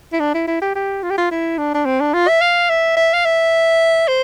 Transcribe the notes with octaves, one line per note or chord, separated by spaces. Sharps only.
E4
D4
E4
E4
G4
G4
F4
G4
F4
E4
D4
D4
C4
D4
F4
E5
F5
E5
E5
F5
E5
C5